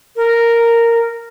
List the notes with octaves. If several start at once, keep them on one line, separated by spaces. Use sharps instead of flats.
A#4